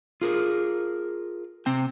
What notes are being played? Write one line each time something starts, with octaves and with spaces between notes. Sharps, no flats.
F4 G#4 A#4
C3 C4 G5